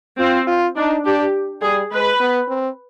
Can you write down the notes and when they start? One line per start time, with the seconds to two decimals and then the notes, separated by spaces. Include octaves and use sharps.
0.19 C4 F4
0.47 F4
0.76 D4 D#4
1.05 D4 G4
1.62 G3 G#4
1.91 G#3 B4
2.20 B3
2.48 C4